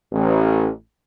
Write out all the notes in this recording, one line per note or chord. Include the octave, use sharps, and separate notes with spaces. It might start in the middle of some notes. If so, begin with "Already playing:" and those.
A1